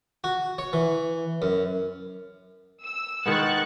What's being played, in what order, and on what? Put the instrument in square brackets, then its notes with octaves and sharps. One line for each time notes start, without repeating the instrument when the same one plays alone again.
[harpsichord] F#4
C#5
E3
F#2
[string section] E6
[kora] D#3 G#3 B3 [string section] C#6 F#6 A6